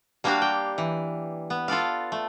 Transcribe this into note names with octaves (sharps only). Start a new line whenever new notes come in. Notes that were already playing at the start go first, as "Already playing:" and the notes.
G3 A#3 D4 F#4 G4 F5
G5
E3
B3
F4 A4 D5 F5
A3